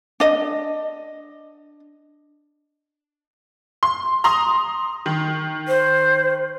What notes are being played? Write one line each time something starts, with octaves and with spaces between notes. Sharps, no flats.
D4 D#5
C6
A#5 C6 D#6
D#3
C5